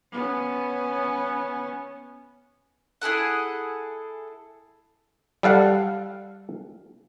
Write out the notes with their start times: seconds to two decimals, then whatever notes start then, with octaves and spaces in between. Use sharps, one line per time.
0.12 B3 C#4
3.01 E4 G#4 A4 F#5
5.43 G3 A4 F5 F#5